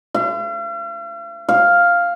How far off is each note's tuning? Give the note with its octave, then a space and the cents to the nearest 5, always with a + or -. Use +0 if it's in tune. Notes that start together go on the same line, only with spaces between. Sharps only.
F5 -45
F5 +0